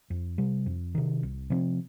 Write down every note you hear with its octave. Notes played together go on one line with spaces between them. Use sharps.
F2
C3 G3
F2
C3 D#3
C2
C3 F3 C4